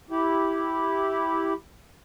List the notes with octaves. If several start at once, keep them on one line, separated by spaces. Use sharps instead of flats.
E4 G4